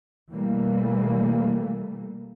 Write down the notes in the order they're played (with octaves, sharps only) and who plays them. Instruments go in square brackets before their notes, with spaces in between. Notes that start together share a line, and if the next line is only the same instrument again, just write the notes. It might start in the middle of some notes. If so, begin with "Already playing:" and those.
[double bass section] B2 E3 G3 A3 A#3